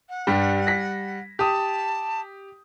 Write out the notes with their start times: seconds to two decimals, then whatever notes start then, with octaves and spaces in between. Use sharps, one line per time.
0.09 F#5
0.27 G2 G3
0.67 A#6 B6
1.39 G4 A5 D#6